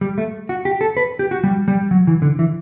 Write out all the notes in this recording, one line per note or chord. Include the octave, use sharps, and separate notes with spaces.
G3
A3
F#4
G4
A4
B4
G4
F#4
G3
G3
F#3
E3
D3
E3